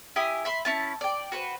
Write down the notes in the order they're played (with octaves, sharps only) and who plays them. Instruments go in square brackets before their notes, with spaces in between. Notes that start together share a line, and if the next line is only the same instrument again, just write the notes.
[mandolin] E4 G4 G#5 D#6
E5 B5 C6
C#4 E4 A5
D5 G5
F#4 B4 C5